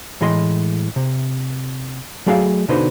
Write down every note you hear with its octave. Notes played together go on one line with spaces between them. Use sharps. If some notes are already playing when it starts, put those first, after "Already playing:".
A2 E3 G#3 D#5 C6
C3
F#3 A3 G#4 D5 E5 F5
B2 D3 D#4 B4 C5